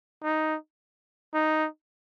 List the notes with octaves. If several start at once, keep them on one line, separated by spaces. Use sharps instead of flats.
D#4
D#4